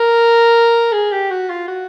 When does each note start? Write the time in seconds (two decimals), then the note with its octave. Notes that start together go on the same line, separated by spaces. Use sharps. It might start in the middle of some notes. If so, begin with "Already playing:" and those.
Already playing: A#4
0.92 G#4
1.12 G4
1.30 F#4
1.49 F4
1.68 F#4